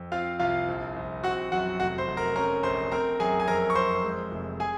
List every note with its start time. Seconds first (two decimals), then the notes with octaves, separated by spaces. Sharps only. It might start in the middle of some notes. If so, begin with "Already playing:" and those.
Already playing: F2
0.12 C4 F4 F5
0.39 C2 F4 F5
0.68 A#1
0.96 A#1
1.23 C4 F#4 F#5
1.52 F#2 F#4 F#5
1.80 F1 F#4 F#5
1.98 C5 C6
2.08 F1
2.17 A#4 A#5
2.35 C#4 A#4 A#5
2.63 A#1 C5 C6
2.92 C4 A#4 A#5
3.20 F#2 G#4 G#5
3.40 G#5
3.48 F2 A#4 A#5
3.70 C#6
3.75 F2 C5 C6
4.04 G#3
4.32 F1
4.60 G#4 G#5